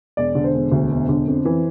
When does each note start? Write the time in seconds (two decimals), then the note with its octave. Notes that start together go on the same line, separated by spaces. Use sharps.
0.17 E1 D5
0.35 D3
0.44 C5
0.54 E1
0.72 D2
0.91 E1
1.09 D3
1.28 F2
1.45 E3